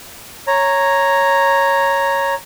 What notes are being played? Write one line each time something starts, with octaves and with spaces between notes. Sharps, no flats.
C#5 A#5